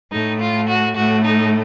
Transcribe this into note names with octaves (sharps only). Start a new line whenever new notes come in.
A2 A3 D#4
F4
F#4
A2 A3 F#4
D#4